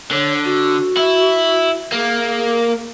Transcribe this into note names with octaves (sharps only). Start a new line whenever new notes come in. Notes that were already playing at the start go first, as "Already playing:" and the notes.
D3 C#5
F#4
E4
A#3 G#4